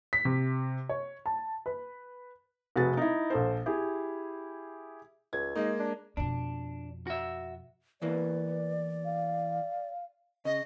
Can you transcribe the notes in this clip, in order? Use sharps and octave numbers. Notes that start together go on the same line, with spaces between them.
B6
C3
C#5
A5
B4
F1 F#4 G#4 B4 A6
D#4 E4
A#1 A4 C5
E4 G4 G#4
C#2 G#6
G#3 A#3 D#4
D4
F2 B2 D4
F#4 E5
E2 E3 A#3 B4 D5
F5
C#3 D#5